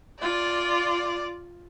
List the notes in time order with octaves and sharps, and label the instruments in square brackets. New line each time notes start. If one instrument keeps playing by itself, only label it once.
[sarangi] F4 [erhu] D5